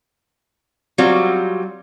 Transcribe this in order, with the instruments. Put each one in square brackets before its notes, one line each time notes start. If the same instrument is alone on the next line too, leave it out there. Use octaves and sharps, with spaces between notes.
[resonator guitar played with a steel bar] F#3 G3 C4 F4 F#4